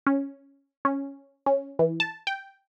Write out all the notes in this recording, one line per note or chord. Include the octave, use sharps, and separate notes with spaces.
C#4
C#4
C#4
E3
A5
G5